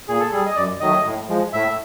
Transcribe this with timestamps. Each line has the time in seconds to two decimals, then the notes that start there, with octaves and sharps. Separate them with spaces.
0.08 A#2 G#4
0.19 A4
0.32 G3 G#4
0.46 D#5
0.56 F#2 D5
0.80 D#3 F#3 A3 D#5
1.05 A2
1.29 F3 G#3
1.53 A2 E5